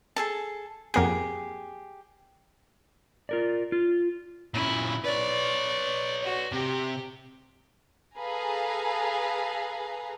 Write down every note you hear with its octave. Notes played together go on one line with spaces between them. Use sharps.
G#4 A4 A5
F2 A#3 G4 G#4 F#5
F4 A#4 D5
F4
A#2 C#3 E4
B4 C#5 D5
F#4
C3 G4
G#4 A4 B4 F5 G#5 A#5